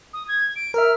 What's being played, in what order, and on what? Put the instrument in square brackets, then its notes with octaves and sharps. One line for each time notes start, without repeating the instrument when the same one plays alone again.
[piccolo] D#6
G#6
D7
[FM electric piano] A#4 E5 [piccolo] F6